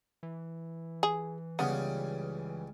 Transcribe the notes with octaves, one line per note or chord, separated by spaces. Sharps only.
E3
G#4
C#2 C#3 G3 B3